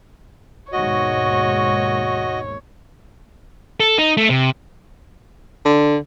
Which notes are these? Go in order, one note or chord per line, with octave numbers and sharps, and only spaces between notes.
D#2 G#2 B2 F#4 C#5 D#5
A4
D#4
A3
C3
D3